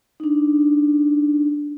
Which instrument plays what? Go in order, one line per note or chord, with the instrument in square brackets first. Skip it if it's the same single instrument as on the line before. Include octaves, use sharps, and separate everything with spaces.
[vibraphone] D4 D#4